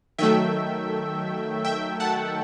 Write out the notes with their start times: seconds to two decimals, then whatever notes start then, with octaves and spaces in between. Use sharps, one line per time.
0.18 D#3 F#3 A3 E5 G5
1.65 E5 G5
2.00 F#5 A5